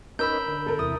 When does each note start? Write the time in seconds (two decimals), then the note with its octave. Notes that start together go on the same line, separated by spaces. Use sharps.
0.19 C#4 D#4 A#4 B4 B5 E6 G6
0.48 D3
0.66 A4 A#4
0.79 E2 C3 E4 D#6